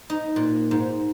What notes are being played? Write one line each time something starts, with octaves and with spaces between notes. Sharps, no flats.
D#4
A#2
G#2